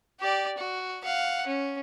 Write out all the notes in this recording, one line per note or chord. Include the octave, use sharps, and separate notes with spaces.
G4 D5
F#4
F5 F#5
C#4